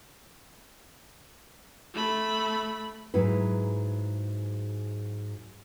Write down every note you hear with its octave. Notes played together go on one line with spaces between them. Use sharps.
A3 B5
G#2 F#3 E4 B4